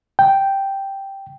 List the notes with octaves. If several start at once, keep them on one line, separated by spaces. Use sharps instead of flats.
G5